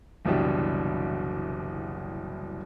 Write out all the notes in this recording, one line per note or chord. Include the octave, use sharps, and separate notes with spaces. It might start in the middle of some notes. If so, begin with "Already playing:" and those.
F#1 C2 B2 E3 D4 G4